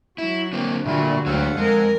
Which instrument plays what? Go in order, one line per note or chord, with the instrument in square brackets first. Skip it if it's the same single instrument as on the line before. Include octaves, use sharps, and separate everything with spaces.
[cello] F#3 [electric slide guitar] E4
[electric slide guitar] D3 A#3 C4
[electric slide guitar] A#2 F4 [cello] D3 F#4 [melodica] G3 A3
[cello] D2 [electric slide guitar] F#3 G4 [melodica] A4 F5 F#5
[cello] F2 A#4 [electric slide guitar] G#3